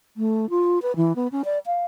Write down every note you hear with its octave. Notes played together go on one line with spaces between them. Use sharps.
A3
F4
B4
E3
B3
C#4
D5
F5